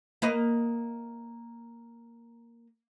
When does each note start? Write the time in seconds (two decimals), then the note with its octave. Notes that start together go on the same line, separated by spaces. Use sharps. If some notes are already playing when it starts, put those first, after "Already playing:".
0.22 A#3 B4 D#5